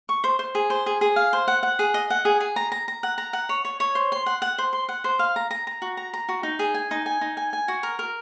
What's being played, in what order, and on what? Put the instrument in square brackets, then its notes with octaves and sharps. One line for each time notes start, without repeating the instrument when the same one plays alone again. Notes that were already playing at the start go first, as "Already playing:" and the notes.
[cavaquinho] C#6
C5
C5
G#4
C5
G#4
G#4
F5
C5
F#5
F#5
G#4
D#5
F#5
G#4
G#4
A#5
A#5
A#5
F#5
A#5
F#5
C#5
C#5
C#5
C5
C6
F#5
F#5
C5
C6
F#5
C5
F5
A#5
A#5
A#5
F#4
A#5
A#5
F#4
D#4
G#4
G#5
D#4
G#5
D#4
G#5
G#5
F#4
A#4
A#4